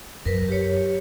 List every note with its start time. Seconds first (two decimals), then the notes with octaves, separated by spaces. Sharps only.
0.25 F#2 A#4 B4
0.48 G4 C#5